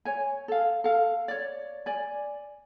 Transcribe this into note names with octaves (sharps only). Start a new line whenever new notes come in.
C#5 G#5
A4 F5
A4 F5
C#5 D5
D5 G#5